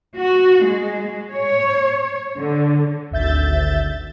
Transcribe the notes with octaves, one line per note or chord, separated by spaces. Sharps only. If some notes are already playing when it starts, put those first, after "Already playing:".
F#4
G#3
C#5
D3
G#1 D2 E5 G6 A6